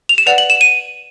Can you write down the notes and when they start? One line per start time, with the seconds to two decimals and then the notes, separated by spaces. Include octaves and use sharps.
0.09 F7
0.18 E7
0.26 B4 D5 F#5 F7
0.38 F#7
0.50 E7
0.61 D#7